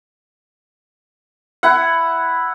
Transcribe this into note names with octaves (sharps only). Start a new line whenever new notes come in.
E4 F#5